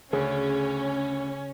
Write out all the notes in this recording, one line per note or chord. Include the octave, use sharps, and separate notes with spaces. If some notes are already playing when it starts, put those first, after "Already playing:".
D2 C#3 C#4 G#4